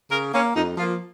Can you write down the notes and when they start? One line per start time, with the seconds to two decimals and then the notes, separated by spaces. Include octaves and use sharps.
0.11 C#3 A#4
0.33 A#3 C#4
0.55 F2 D#4
0.77 F3 A#3 F4